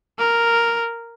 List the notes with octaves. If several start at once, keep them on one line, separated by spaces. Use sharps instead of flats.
A#4